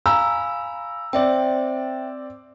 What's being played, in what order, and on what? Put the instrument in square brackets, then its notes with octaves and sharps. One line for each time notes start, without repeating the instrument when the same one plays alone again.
[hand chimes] F5 G#5 B5 [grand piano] A#5 E6
[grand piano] C4 D5 [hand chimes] C5 E5 G5